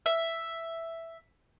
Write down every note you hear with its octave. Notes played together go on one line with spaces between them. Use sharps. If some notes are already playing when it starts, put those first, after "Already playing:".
E5